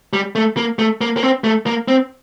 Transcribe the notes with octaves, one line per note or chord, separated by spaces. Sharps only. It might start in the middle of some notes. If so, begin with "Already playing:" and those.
G3
A3
A#3
A3
A#3
A#3
C4
A3
A#3
C4